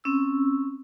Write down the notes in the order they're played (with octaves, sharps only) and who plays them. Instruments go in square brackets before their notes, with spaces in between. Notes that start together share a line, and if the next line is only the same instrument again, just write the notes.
[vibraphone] C4 C#4 E6